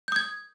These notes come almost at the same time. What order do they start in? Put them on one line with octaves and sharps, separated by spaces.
G6 D#6 G#6